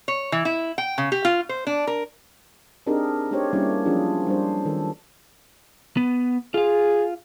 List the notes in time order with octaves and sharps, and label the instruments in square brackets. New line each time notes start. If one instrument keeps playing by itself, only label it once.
[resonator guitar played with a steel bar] C#5
E3
E4
G5
C#3
G4
F4
C5
D4
A#4
[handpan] C4 D4 D#4 G4 G#4 A#4
A3 D4 D#4 G4 C5 C#5
G3 A#3 C#4 D4 E4 G4
F3 F#3 C#4 D4 F4 G#4
G3 D4 C5
D#3 A4
[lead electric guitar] B3
[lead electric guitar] F4 F5 [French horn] G#4